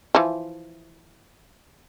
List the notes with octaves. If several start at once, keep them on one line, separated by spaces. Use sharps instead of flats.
E3 F3